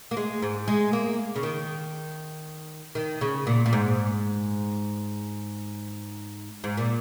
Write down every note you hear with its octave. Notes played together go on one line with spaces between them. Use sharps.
A#3
G#3
G#2
G#3
A#3
C#3
D#3
D#3
C#3
A#2
A#2
G#2
G#2
A#2